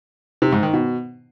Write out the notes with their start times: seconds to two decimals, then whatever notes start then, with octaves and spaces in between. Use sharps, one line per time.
0.42 C3
0.52 G#2
0.63 D#3
0.73 B2